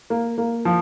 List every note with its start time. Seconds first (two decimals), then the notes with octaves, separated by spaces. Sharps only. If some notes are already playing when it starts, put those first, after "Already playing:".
0.10 A#3
0.38 A#3
0.65 F3